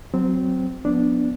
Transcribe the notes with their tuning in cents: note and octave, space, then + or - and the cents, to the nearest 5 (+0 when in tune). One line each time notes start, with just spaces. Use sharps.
F#3 +0 C4 -15
F3 +30 B3 +0 D4 -5